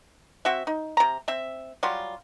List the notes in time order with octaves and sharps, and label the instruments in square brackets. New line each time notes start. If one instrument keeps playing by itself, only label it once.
[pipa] C4 F#4 E5
D#4
C3 A#5
C4 E5
F#3 G3 F4